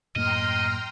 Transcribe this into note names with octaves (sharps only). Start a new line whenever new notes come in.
F#2 A2 A#3 D#5 G5 A#5 C6 F6